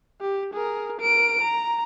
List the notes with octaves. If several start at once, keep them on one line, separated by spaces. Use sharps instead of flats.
G4
G#4 A#4
A#4 D7
A#5